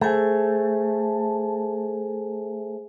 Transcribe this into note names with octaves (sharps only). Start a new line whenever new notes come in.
A3 G#4 C5 G#5